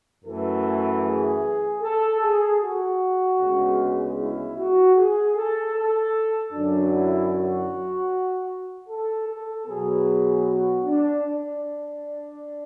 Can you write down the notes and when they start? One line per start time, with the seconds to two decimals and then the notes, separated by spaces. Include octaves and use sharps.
0.25 F#2 E3 A3 A4
1.04 G#4
1.82 A4
2.21 G#4
2.61 F#4
3.39 D2 C#3 G#3 B3
4.17 E4
4.56 F#4
4.96 G#4
5.36 A4
5.74 A4
6.53 F#2 D3 F#3 D4
6.92 E4
7.32 F#4
8.89 A4
9.28 A4
9.67 B2 F#3 B3 G#4
10.46 F#4
10.85 D4
11.24 D4